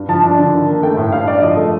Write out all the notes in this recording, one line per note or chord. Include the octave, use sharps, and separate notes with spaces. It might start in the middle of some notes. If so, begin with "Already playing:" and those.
Already playing: G2
F3 A5
D4
D3
D#3
A#3
A3 G5
A2
G2 F5
G2 D5
F3 D#5
A3